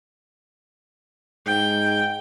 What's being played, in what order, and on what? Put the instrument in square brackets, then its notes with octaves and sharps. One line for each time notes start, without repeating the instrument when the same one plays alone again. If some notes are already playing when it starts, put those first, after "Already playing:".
[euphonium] G#2 [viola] G5